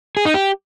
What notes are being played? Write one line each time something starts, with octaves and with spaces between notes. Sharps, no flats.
G#4
D#4
G4